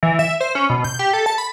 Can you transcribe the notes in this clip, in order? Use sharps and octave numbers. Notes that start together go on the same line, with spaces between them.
E3
E5
C5
C#4
B2
G6
G4
A4
A5
B5